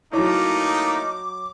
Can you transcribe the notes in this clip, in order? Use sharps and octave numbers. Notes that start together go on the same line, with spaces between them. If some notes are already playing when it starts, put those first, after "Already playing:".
F#3 A3 A#3 D#4 E4 C#5 D6